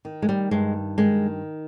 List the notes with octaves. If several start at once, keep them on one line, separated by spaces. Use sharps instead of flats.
D#3
G#3
G3
G2 G#3
D#3 G#3